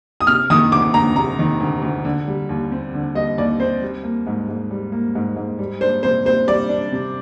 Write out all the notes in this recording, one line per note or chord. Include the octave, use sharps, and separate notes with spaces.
D#6
C3 F6
D#3 D#6
D2 D6
D2 A#5
C3 A#5
D#3
D2
D2
D3
G3
D#2
C4
D3
G3 D#5
D#2 D5
C4 C5
G3
A#3
G#2
G#2
G3
A#3
G#2
G#2
G3
D4 C5
C3 C5
C3 C5
G3 D5
D4
C3